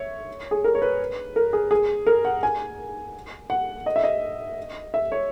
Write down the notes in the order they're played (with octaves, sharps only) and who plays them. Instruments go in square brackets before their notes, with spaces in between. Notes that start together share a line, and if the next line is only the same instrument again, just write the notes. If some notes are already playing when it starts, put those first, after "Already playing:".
Already playing: [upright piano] C#5 E5
G#4
A#4
C#5
B4
A#4
G#4
G#4
A#4
F#5
G#5
F#5
D#5
E5
D#5
E5
C#5